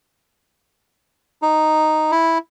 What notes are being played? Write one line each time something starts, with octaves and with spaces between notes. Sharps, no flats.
D#4
E4